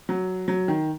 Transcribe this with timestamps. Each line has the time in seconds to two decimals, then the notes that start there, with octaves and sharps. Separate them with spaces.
0.09 F#3
0.48 F#3
0.68 D#3